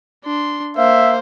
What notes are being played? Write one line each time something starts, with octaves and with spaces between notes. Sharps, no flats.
D4 C6
A#3 C5 E5 F5